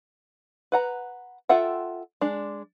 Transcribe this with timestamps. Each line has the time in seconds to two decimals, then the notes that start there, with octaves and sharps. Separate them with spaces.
0.72 B4 F#5 A#5
1.49 F4 A4 E5 F#5 G5
2.21 G#3 D4